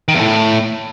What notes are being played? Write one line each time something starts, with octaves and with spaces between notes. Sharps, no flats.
D#3
E2
A2